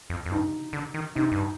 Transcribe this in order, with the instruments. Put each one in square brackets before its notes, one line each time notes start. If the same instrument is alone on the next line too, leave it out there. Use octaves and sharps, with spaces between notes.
[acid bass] F2
F2
[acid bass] G2 [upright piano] D#4
[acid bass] D3
D#3
[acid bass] C3 [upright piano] D#4
[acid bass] G2